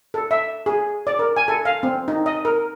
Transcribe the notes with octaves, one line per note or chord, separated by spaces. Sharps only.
A4
E5
G#4
D5
A#4
G#5
A4
F5
C4
D#4
D#5
A#4